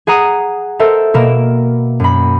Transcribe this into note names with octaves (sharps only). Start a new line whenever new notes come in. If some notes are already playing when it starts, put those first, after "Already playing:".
G#4 F#5 A#5 D#6 D#7
A4 A#4 C5 E5
B2 A#3 A#4 E7
F#2 B5